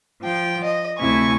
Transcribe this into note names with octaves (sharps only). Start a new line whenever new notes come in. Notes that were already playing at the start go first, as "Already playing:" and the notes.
F3 G5
D#5
D2 C3 E4 G#5 C#6